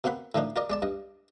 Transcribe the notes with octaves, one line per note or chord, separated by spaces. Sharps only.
B2 A#3 C4 F#5 B5
A2 D#3 F3 D4 D#4
F4 A#4 D5 D#5
G#3 D5 A5
G2 D#5